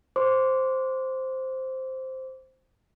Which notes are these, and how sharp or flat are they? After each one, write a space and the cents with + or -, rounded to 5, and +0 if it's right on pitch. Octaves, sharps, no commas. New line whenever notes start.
C5 +0 D6 -30